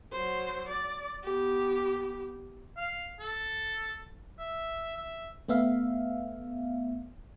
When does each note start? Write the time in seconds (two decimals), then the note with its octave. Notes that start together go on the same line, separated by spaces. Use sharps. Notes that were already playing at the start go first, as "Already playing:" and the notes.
0.12 F#3 C5
0.68 D5
1.24 B3 G4
2.77 F5
3.20 A4
4.39 E5
4.97 E5
5.49 A3 B3 E5 F5